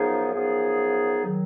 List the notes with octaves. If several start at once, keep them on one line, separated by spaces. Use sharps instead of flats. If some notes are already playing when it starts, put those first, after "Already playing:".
Already playing: F#2 F3 B3 D#4 G#4
F#2 F3 B3 D#4 G#4
D#3 F#3